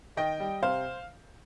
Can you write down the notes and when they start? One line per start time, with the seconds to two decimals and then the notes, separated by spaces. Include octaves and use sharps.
0.17 D#3 D#5 G5
0.40 G3
0.63 C3 C5 F5